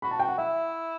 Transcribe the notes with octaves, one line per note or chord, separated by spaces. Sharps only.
F#4 B5
A5
G5
F#5
E4 E5